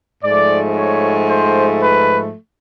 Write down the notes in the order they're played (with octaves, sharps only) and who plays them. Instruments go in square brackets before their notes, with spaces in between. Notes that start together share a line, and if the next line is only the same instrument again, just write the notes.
[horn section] G#2 F3 A3 D5
C#5
C5
B4